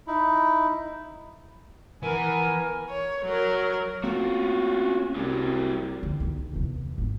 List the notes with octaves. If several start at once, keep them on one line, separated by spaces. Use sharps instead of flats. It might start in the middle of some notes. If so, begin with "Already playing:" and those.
D#4 E4
E3 B3 A#4 G#5
C#5
F#3 A#4
A3 A#3 C4 C#4 F4 F#4
C2 F#3 G4
D3
B1
E2 C3
G#1